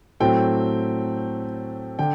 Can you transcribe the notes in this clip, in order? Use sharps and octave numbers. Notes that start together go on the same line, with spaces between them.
A2 F#3 A3 C4 G5
D3 G5